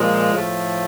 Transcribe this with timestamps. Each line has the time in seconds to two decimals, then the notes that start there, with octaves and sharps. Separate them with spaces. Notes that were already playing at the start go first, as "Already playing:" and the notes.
Already playing: A#2 F3 G#3
0.33 A2 F3 A3